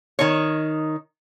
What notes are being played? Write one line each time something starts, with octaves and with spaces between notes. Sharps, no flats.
D#3 D#4 C#5